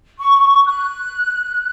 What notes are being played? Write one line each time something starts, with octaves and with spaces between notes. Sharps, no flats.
C#6
F#6